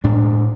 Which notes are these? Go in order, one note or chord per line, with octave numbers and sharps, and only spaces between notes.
A2 G#3 D4